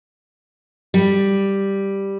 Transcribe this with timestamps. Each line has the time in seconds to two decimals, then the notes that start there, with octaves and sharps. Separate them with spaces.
0.94 G3